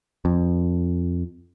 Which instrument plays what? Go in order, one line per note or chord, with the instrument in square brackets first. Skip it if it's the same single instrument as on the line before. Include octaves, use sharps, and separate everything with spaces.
[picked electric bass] F2